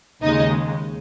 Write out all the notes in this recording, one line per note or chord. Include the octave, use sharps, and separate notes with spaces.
D#2 C#3 G#3 D#4 D#5